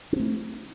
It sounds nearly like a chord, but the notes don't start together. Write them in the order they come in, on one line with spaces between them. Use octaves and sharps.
C#4 C4 A3